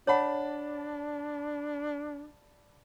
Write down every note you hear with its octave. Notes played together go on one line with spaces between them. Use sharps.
D4 C#5 D5 F#5 A5 B5